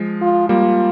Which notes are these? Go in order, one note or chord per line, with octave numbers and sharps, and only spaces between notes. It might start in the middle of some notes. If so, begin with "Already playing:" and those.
Already playing: F3 G#3
F4
G3 A#3 F4